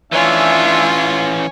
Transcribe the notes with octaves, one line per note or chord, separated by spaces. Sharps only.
E3 C#4 D4 E4 F4 C#5 E5 G#5